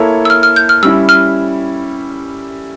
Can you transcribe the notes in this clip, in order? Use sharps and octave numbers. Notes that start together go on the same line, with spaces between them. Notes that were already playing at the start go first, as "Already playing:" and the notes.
Already playing: A#3 E4 A4 C#5
E6
F6
F6
G6
F6
G3 C#4 E4 E6
F6